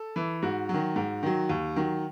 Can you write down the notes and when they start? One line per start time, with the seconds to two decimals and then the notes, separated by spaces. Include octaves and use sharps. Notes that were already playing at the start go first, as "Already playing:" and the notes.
Already playing: A4
0.16 E3
0.42 G#2 F#4
0.69 D#3 F#3
0.96 G#2
1.23 D#3 F#3
1.49 D#2
1.76 D#3 F#3